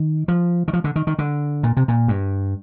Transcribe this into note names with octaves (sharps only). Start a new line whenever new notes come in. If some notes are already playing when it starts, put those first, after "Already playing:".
Already playing: D#3
F3
D#3
F3
D3
D#3
D#3
D3
A#2
C3
A#2
G2